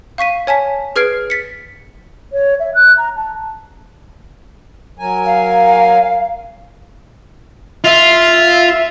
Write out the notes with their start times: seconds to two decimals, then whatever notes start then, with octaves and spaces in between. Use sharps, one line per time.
0.18 F5 C#6 B6 D#7
0.47 C#5 G#5 A5 B6
0.96 G#4 B4 F6 G#6 C7 D7
1.30 A6 B6 C#7
2.32 C#5
2.59 E5
2.75 F#6
2.97 A#5
3.16 A5
4.99 F#3 A#4 G#5
5.26 F5
7.84 F4 E5